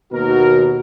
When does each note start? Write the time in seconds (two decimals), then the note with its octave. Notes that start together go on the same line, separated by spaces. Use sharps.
0.12 D#2 B2 F#4 A#4